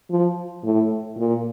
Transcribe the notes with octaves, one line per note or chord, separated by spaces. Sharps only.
F3
A2
A#2